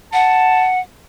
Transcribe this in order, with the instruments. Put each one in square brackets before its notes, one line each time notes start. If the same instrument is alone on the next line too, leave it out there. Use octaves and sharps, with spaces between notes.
[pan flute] F#5 [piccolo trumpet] A5